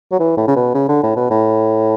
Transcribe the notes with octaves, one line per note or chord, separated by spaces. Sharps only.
F#3
E3
A2
C#3
B2
C#3
D3
A2
B2
A2